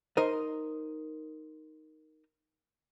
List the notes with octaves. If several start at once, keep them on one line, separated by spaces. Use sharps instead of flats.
D#4 A#4 C5 D#5